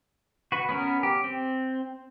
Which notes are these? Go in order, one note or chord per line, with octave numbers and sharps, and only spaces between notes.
F#4 B4
B3 C#4 A#4
G4
C4